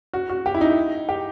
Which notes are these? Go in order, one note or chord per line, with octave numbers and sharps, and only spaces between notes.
F#4
F#4
G4
E4
D#4
G4